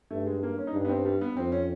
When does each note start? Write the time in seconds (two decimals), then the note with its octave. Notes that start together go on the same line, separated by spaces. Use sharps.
0.11 G2 A3
0.27 G#3
0.43 A#3
0.58 C#4
0.67 D#4
0.73 G2 D4
0.85 B3
0.89 C4
1.05 G3
1.21 B3
1.37 F2 C4
1.52 C#4